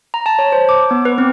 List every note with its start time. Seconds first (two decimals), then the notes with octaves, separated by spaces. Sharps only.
0.14 A#5
0.26 A5
0.39 C#5
0.52 C5
0.69 D6
0.91 B3
1.05 B4
1.18 C4